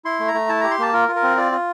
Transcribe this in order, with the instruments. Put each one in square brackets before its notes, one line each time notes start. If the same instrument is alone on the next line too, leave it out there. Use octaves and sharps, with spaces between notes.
[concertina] E4 C6
A3
A#5
A3
E4 A5
G4 A#5
C6
A#3 A5
F4 A#4
F4
A#4
C4
F4 D5
F4